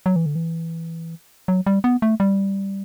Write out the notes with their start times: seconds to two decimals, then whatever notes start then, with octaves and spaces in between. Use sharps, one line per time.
0.06 F#3
0.16 E3
0.26 D3
0.35 E3
1.48 F#3
1.66 G3
1.84 B3
2.02 A3
2.20 G3